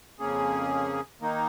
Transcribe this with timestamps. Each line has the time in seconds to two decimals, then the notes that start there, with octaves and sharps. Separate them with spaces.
0.19 F2 C#3 A#3 C#4 G#4
1.21 D#3 A#3 D#4